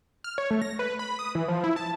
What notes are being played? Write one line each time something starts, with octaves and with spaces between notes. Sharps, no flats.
F6
C#5
A3
A#6
B4
B5
D#6
E3
F3
E4
A5